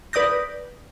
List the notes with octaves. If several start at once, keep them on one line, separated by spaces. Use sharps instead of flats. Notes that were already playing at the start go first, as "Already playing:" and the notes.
B4 D5 D#6 G6 A#6